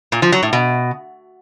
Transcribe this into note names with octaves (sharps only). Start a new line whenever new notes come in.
A#2
F3
F#3
A2
B2